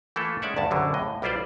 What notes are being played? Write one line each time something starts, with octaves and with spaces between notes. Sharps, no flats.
E3 A3 A#3 E4 F4 A4
G#3 C#4 D5 E5 F#5
D2 G2 A5
A#1 F#2 D3 F#3 G3
F2 A2 D#5
B1 G3 E4 F4 C5 D5